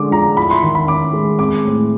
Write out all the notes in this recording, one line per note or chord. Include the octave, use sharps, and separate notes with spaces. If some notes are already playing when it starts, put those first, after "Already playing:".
Already playing: D3 G#3 C#4 D6
F3 A#5
E4 B5
C6
D#3 C6
B5
C#4 D6
G#3
C4 D6
A2